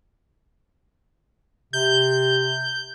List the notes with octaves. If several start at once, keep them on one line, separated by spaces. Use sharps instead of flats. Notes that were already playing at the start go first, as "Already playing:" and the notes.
C3 G6